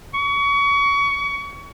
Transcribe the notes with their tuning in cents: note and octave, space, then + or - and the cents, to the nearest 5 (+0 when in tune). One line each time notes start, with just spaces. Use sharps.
C#6 +30